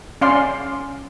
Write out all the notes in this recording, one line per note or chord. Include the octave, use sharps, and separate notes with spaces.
C#4 D5 F5 C6